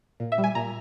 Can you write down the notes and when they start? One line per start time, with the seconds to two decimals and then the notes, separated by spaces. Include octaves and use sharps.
0.20 A#2
0.32 E5
0.38 G3
0.44 G#5
0.55 A#2 A#5